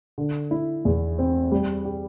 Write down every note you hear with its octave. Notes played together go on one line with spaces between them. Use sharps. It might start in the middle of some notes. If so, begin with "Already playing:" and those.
D3
E4
E2
C4
G3
G4